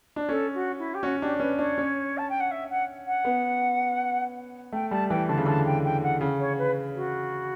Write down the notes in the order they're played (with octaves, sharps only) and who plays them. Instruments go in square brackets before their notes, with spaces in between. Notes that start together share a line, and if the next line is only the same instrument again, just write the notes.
[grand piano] D4
[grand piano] C#4 [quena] A4
[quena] F#4
E4
G4
[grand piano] C#4 [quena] F#4
[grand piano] D4 [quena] G4
[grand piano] C#4 [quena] B4
[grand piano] D4 [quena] C#5
[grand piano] C#4
[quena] A5
G5
F#5
E5
F#5
F#5
[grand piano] B3
[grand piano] A3 [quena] G5
[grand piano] G3 [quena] A5
[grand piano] E3 [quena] G5
[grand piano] D3 [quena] A5
[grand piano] C#3
[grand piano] D3 [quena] A5
[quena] G5
G5
F#5
[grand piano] C#3
[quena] C#5
B4
F#4